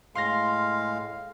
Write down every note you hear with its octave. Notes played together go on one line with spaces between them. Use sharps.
A2 G#3 F5 C6 F6 A#6